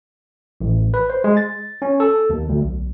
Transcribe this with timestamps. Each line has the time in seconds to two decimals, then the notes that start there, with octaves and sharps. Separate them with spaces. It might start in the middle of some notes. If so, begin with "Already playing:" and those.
0.61 A1
0.94 B4
1.10 C5
1.24 G#3
1.37 A6
1.82 C#4
2.00 A4
2.30 D#2
2.49 D2
2.62 B1